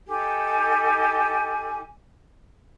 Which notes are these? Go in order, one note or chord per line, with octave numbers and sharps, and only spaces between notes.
D#4 G4 A4 G#5